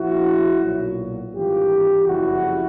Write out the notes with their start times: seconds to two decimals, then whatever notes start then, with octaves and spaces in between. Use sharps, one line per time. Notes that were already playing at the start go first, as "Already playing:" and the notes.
Already playing: A#1 A#2 F3 E4 F#4
0.61 B1 A#2 F#3
1.33 G#1 G2 E3 F4 G4
2.05 F#1 F2 C#3 E3 G3 E4 F#4